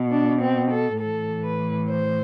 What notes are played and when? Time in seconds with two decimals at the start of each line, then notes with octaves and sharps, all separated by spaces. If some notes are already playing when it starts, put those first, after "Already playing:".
Already playing: B2
0.11 D4
0.41 C4
0.70 A4
0.99 A2 E3 A4
1.44 B4
1.89 C5